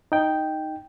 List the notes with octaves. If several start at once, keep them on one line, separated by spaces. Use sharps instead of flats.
D#4 G5